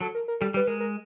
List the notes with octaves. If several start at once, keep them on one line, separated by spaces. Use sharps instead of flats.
F#3 A4
A#4
A#4
G3 A4
G3 B4
G#3 A#4
A#4